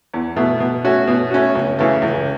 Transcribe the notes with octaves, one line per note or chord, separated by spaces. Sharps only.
E2
B2 A3
B2
A3 C#4 F#4
B2
A3 C#4 F#4
C#2
C#3 E3 A3
C#2